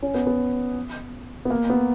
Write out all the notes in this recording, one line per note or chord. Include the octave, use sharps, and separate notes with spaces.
C#4
B3
B3
B3
A#3
B3